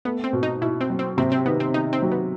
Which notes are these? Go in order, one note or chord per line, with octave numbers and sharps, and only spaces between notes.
A3 B3
C4
B2
D#4
B2 E4
C4
F#3
C4
C3 C4
C4
D#3 B3
C4
D#3 D#4
C4
F#3
B3